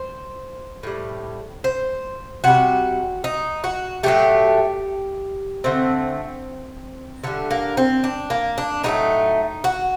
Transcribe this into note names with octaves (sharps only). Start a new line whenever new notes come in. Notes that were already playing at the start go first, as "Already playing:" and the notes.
Already playing: C5
A2 G3
C5
C3 G3 F#4
D#4
F#4
A2 F#3 A3 G4
D3 A3 C4
D3 G3 A3
A#3
C4
D4
A#3
D4
A2 F#3 A3 D#4
F#4